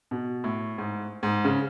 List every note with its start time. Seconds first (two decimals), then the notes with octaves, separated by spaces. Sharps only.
0.11 B2
0.44 A2
0.78 G#2
1.23 G#2
1.45 C#3